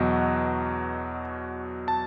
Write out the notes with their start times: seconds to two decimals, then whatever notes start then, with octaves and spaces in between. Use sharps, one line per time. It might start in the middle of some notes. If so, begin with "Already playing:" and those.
Already playing: E2 B2 F#3 D#5 F#5
1.88 A5